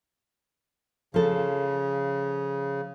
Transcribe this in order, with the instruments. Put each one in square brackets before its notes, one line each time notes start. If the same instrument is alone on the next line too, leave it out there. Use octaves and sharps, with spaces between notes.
[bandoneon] C#3 [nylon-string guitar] F3 A4